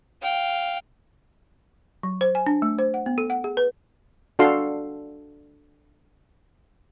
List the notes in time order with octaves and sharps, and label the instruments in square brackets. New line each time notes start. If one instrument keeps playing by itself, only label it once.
[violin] F5 G5
[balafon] F#3
C5
G#5
D4
A3
C5
F#5
B3
A4
F#5
G#4
B4
[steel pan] D4 F#4 A4 F5 C6